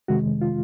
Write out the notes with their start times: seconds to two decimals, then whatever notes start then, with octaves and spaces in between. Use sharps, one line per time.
0.08 F2 C3 D#3 G#3 F#4
0.41 F4